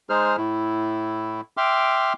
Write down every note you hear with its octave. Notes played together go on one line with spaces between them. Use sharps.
G#3 D#4 G#4 C5 F6
A2 E4
E5 G5 C6 D6 F6